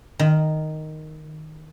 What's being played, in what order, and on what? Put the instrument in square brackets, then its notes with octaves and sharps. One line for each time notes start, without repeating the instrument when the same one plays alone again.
[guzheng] D#3